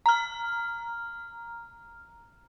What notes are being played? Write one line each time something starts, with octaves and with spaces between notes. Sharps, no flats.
A#5 F6